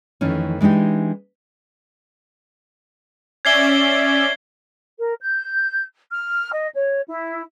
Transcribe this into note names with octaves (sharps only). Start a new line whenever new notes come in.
F2 D#3 E3 A3 C#4
E3 G#3 D4 D#4 G4
C#4 D5 E5 G#6 C7 G7
A#4
G6
F6
D#5
C#5
E4